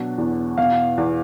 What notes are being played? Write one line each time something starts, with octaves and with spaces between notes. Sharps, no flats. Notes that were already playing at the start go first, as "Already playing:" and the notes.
Already playing: B2 F#3 D4
E2
B2 F5
E2